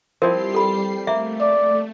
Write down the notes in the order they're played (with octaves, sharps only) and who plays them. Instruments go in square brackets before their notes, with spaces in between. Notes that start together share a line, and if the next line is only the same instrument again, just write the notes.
[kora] F3 C4 E4 [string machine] G3 G4 C7 [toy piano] A#4
[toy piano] A4 B5
[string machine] A3 [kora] A#3 [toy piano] E5
[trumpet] D5